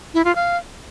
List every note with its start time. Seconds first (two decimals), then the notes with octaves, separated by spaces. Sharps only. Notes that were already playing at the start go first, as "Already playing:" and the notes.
0.14 E4
0.25 F4
0.35 F5